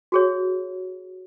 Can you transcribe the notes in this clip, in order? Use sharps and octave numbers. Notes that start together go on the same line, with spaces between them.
F#4 G#4 C#5